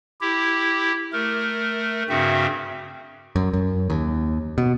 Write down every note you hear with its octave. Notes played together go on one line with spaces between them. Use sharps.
E4 G4
A3 A#4
G2 C#3 C4 F#4 E5
F#2
F#2
D#2
B2